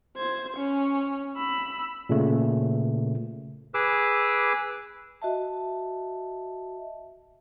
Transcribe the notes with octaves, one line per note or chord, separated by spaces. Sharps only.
C5 G#6
C#4 C#5
B5 E6
A#2 C#3 A3
G#4 B4 D6 E6
F#4 D#5 E5 A5